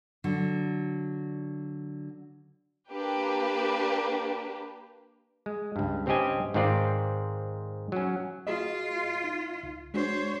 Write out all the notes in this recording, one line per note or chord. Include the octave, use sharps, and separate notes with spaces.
D3 F#3
A#3 D4 G4 B4
G#3
C#2 G2
G2 C4 C#4 G4 D#5 G#5
G#2 D#3 C4 F4 D5
F#3 C#4
F4 F#4 G#4 D#5
D#4
C#2
G#3 D4 F#4 C5 C#5